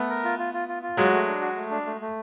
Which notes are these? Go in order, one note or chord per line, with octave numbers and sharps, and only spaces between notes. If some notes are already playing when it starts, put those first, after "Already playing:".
Already playing: A3 B3
A#4
F4
F4
F4
F4
F4
F#3 G#3 F#4
A3
D4
F#4
A3
D4
A3
A3